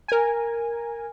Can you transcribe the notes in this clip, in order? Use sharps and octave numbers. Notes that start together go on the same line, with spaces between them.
A#4 G#5